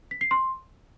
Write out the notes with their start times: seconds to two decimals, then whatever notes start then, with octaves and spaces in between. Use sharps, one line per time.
0.11 B6
0.21 C7
0.31 C6